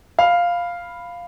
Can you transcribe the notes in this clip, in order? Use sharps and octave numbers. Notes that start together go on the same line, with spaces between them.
F5 B5